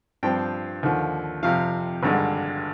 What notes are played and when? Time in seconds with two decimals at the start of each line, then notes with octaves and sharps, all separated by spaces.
0.23 G2 F3 C4 G5
0.83 D#2 D3 F3
1.43 F2 C3 F3 F5
2.03 G#1 G2 D3 G#3